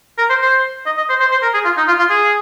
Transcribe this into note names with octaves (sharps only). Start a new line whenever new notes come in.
A#4
C5
C5
D#5
D#5
C5
C5
C5
A#4
G#4
F4
D#4
F4
F4
G#4